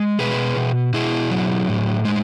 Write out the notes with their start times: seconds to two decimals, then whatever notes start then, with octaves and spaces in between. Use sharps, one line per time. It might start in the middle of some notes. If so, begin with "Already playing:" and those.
Already playing: G#3
0.19 B2 G#4 B4
0.57 B2
0.93 B2 E4 G#4
1.31 F#3
1.68 A2
2.05 G#3